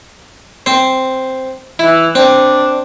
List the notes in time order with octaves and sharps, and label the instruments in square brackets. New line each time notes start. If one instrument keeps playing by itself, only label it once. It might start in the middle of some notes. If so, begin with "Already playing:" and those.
[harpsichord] C4 C5
[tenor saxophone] E3 [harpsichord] E4
[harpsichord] C4 [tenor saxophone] D4